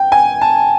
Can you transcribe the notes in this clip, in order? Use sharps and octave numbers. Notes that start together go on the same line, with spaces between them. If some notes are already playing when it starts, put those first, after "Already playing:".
Already playing: G5
G#5
A5